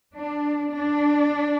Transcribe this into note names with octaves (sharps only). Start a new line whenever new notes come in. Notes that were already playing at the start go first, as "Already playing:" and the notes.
D4
D4